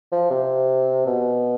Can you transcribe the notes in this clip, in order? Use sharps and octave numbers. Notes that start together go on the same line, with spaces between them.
F3
C3
B2